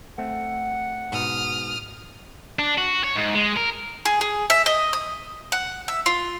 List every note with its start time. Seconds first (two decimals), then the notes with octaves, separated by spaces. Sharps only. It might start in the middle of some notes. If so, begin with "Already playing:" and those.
0.18 A3 C4 F#5
1.12 G#2 B2 D#6 F6
2.59 D4
2.78 F#4
3.04 C#5
3.16 G#2
3.34 G#3
3.56 A#4
4.05 G#4
4.21 G#4
4.50 E5
4.66 D#5
4.93 D#6
5.52 F#5
5.88 E5
6.06 F4